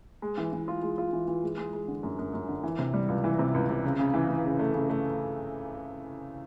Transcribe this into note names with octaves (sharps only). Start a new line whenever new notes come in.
G#3
E3
E3
F4
G#3
F4
E3
E3
G#3
G#3
G#3
D3
F#2
F#2
F#2
D3
E3
C3
G3
C#2
E3
C3
C#2
C3
C#3
C#3
E3
E3
C#3
A3
C#3
A3